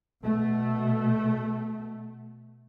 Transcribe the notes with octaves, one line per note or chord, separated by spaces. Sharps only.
B2 A3